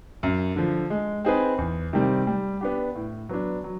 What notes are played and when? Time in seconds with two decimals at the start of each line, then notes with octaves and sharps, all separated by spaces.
0.23 F#2
0.56 D3 F3
0.90 G#3
1.25 C4 D#4 G#4 B4
1.58 E2
1.93 C3 D#3 G3 C4
2.27 G3
2.61 B3 D4 G4
2.95 A2
3.29 F#3 B3 D4
3.64 F#3